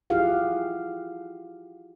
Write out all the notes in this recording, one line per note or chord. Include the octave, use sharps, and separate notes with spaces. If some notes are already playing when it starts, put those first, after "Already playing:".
E4 F4 G4 G#4 F5 F#5